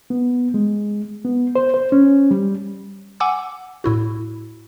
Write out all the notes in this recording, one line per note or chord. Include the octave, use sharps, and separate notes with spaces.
B3
G#3
B3
C5
C5
C#4
G3
F#5 G#5 D6 E6
A2 E4 F#4